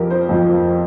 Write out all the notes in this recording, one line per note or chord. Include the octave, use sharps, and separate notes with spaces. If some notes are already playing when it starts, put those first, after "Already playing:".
Already playing: F2 F3 G4 A#4
C5
F2 F3